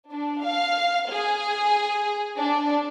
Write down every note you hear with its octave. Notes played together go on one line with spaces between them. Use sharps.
D4
F5
G#4
D4